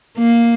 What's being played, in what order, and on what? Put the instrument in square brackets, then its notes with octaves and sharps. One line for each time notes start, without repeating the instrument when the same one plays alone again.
[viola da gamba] A#3